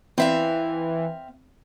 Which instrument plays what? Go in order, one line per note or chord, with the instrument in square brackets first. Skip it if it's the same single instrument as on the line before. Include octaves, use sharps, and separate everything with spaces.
[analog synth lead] E3 [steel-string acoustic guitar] C4 E5 F5